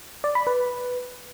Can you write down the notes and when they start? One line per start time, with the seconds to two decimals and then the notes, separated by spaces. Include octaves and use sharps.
0.24 D5
0.35 B5
0.47 B4